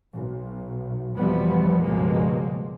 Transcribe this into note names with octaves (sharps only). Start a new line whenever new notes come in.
B1
F1 B2 E3 F3 G3 B3
C#2 G2 B2 F3 G#3 A#3